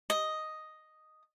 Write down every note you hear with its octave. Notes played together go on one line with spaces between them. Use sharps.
D#5